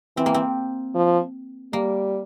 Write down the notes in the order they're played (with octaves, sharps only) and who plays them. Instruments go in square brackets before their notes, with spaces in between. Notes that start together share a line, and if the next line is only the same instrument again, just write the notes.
[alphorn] E3 [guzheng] C4
[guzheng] A#3
C4
[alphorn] F3
[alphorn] G3 [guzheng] A#3